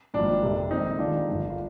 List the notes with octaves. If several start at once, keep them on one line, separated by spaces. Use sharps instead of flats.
G#1 G2 F3 A#3 D4
F1 F2 C3 G3
A#1 G#2 D#3 C4 D#4
D#2 D#3 G#3 D4 F4
G1 G2 F3
F4